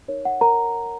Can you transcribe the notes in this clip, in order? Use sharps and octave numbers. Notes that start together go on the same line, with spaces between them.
D#4 A#4 C#5
F#5
A#4 A#5